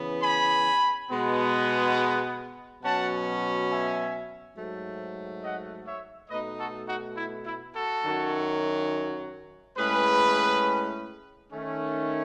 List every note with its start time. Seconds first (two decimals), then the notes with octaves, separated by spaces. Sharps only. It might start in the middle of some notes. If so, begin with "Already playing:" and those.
Already playing: C#3 E3 B3
0.22 G#5 B5
1.09 B2 G#3 B3
2.82 B2 F#3 C#4 F#5 A5
3.69 E5 G#5
4.56 G#2 F#3 A3
5.43 D#5 F#5
5.86 C#5 E5
6.29 B2 A3 D#4 B4 D#5
6.58 F#4 A4
6.87 D#4 F#4
7.16 E4
7.45 E4
7.74 F#4 A4
8.03 F#2 D#3 F#3
9.76 A2 G#3 C#4 G#4 B4
11.51 D#3 A3 C#4